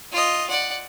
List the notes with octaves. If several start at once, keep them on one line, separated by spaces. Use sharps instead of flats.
F4 D#5
D5 F#5